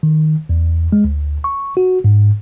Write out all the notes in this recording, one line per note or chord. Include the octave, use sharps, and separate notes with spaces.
D#3
E2
G#3
D2
C#6
F#4
G#2